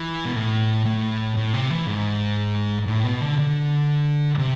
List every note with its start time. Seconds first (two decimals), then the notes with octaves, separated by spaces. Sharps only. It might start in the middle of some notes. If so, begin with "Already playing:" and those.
Already playing: E3
0.25 B2
0.36 A2
0.86 A2
1.37 A2
1.54 C3
1.70 E3
1.87 G#2
2.87 A2
3.04 B2
3.21 D3
3.38 D3
4.39 C3